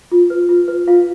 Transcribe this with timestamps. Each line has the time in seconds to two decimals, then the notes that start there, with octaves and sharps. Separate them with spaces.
0.12 F4
0.30 B4
0.49 F4
0.68 B4
0.87 F4 F5